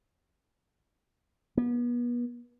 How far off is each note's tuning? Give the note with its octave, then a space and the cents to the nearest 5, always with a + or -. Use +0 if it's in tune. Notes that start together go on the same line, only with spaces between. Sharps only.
B3 -35